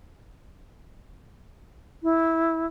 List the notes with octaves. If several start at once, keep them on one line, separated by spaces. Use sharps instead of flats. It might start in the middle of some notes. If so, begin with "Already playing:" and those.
E4